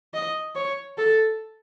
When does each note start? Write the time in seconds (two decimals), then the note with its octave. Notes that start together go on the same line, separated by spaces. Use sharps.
0.14 D#5
0.55 C#5
0.98 A4